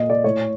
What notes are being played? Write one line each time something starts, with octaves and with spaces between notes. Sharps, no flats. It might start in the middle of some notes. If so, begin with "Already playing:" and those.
Already playing: A#2 D#5
D5
A2 C#5